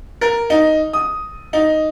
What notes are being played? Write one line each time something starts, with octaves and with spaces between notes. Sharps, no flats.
A#4
D#4
D#6
D#4